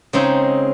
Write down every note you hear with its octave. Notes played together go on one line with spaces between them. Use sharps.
C#3 G#3 C4 D#4